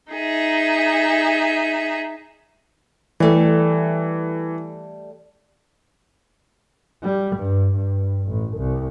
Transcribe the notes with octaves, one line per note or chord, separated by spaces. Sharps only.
D#4 G#4 E5
E3 G3 A3
G3
G2
G2
A1
C2